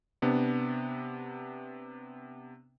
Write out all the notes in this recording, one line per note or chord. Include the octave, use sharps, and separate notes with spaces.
C3 B3 D4